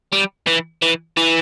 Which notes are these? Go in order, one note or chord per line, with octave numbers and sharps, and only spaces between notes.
G3
E3
E3
E3